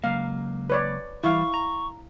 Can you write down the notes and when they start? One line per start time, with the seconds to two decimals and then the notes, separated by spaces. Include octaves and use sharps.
0.04 C#2 F#3 A#3 F5
0.70 B4 C#5 D5
1.24 E3 G3 E4 F5 C#6
1.54 A#5